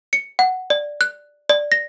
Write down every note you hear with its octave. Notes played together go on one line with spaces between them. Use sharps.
C#7
F#5
D5
F#6
D5
A#6